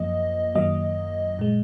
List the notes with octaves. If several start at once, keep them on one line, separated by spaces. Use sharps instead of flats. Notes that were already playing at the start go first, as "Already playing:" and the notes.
Already playing: F#2 F3 A#3 D#5
F#2 D#3 F#3 A#3 D#5
A#2 G#3